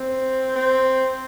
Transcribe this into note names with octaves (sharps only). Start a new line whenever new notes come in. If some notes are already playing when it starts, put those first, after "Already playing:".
Already playing: C4
C4